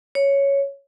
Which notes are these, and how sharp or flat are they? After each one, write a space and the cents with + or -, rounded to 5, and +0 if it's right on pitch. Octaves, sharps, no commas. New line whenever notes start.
C#5 +5